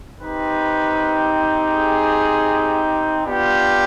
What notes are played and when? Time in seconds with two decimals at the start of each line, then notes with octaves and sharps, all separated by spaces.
0.20 C4 D#4 G4 B4
1.72 G#4
3.24 B3 D4 F4 G4